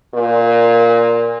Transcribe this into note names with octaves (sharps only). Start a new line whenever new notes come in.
A#2